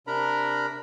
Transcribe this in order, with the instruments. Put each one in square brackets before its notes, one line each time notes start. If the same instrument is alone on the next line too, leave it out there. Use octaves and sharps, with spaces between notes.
[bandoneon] C3 D4 A#4 A#5 B5